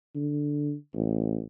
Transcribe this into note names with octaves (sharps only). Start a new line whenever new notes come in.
D3
A1